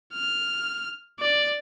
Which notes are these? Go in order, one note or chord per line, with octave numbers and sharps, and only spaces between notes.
F6
D5